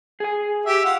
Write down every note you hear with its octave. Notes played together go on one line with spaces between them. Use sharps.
G#4 G#5
G4 E5 E6
F4 F5 F#5